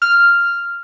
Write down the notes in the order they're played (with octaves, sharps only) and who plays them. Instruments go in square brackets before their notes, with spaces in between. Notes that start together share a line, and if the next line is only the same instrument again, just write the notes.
[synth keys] F6